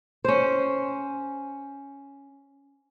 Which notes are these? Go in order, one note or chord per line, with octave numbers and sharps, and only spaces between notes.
C#4 C5